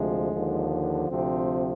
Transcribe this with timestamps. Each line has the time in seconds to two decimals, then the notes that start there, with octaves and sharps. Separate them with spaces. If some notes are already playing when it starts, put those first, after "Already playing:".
Already playing: D2 C3 F3 G#3
0.32 D#2 D3 F3
1.09 D2 C3 F3 C4